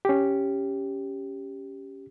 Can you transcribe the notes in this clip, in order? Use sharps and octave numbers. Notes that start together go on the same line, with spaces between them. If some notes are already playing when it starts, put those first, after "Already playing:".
C#4 G4